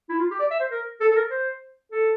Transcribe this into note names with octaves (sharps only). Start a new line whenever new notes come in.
E4
F4
G4
D5
E5
C5
A#4
A4
A4
A#4
C5
A4